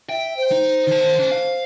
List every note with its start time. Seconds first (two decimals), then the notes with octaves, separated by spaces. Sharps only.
0.09 E5 G5
0.37 C5
0.51 D#4
0.87 D#3 A5
1.19 C#4 A5
1.31 F5